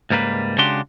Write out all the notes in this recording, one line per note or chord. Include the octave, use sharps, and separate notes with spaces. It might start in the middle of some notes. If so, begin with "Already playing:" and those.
C#2 G#2 G3 A#3 B4
C#3 G#3 D4 F#4 G4 C6